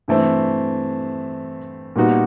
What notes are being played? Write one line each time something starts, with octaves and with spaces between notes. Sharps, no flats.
G2 E3 A3 C4
A#2 G3 B3 D#4 F#4